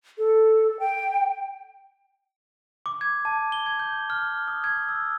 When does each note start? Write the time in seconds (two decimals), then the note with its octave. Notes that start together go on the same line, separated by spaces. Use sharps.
0.18 A4
0.80 G5
2.86 D6
3.01 G#6
3.25 A5
3.52 G7
3.66 G#6
3.80 G6
4.10 F6
4.48 D#6
4.64 G#6
4.89 E6